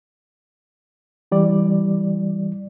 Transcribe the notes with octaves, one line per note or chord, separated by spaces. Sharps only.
E3 G3 D5